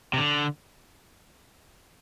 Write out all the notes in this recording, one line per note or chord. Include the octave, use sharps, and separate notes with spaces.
C3
D3